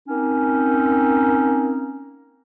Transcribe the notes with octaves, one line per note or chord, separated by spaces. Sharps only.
A#3 C4 C#4 D#4